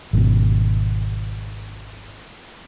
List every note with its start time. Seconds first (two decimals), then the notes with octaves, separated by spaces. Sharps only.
0.13 G#1 B2